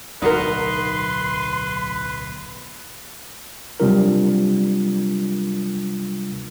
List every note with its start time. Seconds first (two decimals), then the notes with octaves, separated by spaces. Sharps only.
0.22 D1 B1 D#4 F#4 A#4 B4 C6
3.80 C3 F#3 G3 D4 F4 A#4